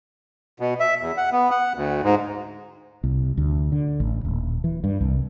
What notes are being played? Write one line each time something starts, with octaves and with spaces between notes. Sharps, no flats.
B2
E5
E2
F#5
B3
F#5
D2
G#2
C2
D2
D3
A1
D#1
E3
G2
C2